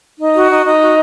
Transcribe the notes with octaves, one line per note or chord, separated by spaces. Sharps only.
D#4
F#4
D#4
D#4
F#4